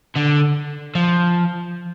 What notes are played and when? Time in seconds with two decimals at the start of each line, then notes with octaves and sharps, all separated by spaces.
0.16 D3
0.95 F3